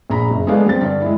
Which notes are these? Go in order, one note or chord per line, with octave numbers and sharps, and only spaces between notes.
A#1 G#4 A#5 B5
F#1
G#3 A3 B3 D4 G#4 F5
G3 C4 A6
G2 D3 D5
G#3 E4